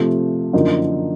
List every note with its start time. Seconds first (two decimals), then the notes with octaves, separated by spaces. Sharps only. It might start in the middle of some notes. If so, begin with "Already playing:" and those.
Already playing: C3 F3 A3
0.53 F#2 D3 F3 A#3 D#4